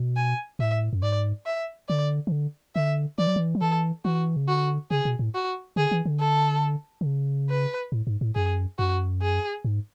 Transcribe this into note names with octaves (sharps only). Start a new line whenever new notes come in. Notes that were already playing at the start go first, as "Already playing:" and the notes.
Already playing: B2
G#5
A2 E5
F#2
G#2 D5
E5
D3 D5
E3
D3
D3 E5
E3 D5
F#3
E3
F#3
E3 A4
E3 F#4
C#3
D3 F#4
C#3 G#4
B2
A2
F#4
D3 G#4
E3
D3
A4
D3
C#3
B4
A2
G#2
A2
F#2 G#4
F#2 F#4
G#4
G#2